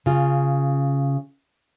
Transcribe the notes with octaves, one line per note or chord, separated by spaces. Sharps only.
C#3 F4